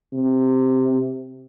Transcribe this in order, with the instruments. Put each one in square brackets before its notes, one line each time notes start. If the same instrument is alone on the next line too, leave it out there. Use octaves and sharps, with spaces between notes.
[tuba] C3